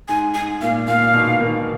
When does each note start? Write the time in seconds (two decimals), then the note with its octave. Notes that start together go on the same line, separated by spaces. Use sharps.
0.08 G#2 G#5
0.35 G#2 G#5
0.62 A#2 F5
0.88 A#2 F5
1.14 G#2 B2
1.40 B2 D#3